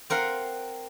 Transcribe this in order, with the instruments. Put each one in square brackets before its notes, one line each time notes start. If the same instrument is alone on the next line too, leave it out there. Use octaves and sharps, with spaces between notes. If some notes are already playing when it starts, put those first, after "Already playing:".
[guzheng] C4 A#4 F5 F#5